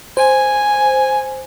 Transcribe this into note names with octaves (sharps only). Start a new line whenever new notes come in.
C5 G#5